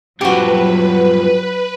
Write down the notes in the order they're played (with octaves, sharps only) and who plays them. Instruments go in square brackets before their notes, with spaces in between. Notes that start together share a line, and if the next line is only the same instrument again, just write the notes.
[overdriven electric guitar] G2 F3 [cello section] F#3 [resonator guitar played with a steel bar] F#4 G4 [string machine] B4